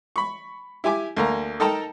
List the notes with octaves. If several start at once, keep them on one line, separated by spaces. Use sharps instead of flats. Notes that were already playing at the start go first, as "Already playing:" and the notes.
B5 C#6
E4 G4 G#5 D6
D2 A#3 A#5
D#4 A4 A#4 G5 A5 A#5